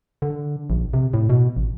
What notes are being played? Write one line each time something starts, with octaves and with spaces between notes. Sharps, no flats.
D3
A#1
C3
A2
B2
A1